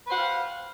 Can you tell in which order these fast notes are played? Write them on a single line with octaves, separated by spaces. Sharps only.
B4 C5 F#5 F5 G4